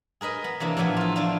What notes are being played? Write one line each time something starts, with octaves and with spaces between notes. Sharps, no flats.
G#4 A#4 B4 D#5
B3
C3 E3 A#3 D4
A2 E3 F3 B3 F#5 G#5
F4 A4
F3 D4 E4 F4